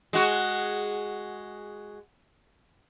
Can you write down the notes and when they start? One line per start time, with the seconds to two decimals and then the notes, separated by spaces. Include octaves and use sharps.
0.13 G#3 F#4